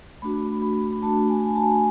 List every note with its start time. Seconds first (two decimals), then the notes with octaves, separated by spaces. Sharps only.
0.22 A3 D4 F#4 B5
0.62 B5
0.93 B5
1.02 A3 D4 F#4 A5
1.29 G#5
1.44 G#5
1.56 A5